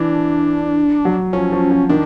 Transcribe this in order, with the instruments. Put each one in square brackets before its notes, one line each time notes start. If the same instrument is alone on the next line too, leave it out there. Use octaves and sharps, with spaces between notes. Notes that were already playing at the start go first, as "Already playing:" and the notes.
Already playing: [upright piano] E3 [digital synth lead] D4
[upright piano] F#3
[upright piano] F3 [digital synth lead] C#4
[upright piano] F3
F3
[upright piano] D#3 [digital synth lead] D4